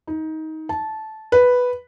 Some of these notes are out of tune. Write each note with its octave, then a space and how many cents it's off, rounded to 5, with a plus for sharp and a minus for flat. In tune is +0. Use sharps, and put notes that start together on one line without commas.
D#4 +20
A5 -15
B4 +0